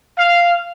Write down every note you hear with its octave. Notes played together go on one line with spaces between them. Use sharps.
F5